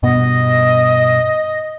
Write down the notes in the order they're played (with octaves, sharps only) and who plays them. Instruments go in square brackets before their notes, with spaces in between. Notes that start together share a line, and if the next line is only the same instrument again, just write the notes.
[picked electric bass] G2 B2 B3 [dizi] D#5